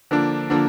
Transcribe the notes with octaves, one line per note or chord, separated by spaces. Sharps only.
D3 F3 A#3 D4
D3 F3 A#3 D4